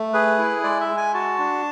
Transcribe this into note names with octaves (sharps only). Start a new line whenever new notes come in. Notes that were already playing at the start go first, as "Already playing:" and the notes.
Already playing: A3
G#4 B4
E4
G#3 D5
E5
G#3
G#5
F#4 A5
D4